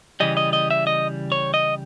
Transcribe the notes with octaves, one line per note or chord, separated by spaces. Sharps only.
C#3 E3 G3 D#5
D#5
D#5
E5
D#5
C#5
D#5